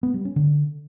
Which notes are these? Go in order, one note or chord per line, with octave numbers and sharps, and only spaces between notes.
B3
G3
C#4
D3